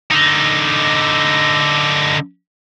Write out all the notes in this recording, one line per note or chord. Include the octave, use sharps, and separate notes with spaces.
D3 D#4